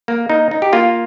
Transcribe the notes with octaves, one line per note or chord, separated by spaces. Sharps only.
A#3
A#3 D#4
D#4
G4
A#3 F4